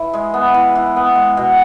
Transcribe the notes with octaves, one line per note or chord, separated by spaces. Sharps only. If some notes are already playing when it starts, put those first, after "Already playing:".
Already playing: E3
G#3
B3
E3
E3
B3
G#3
B2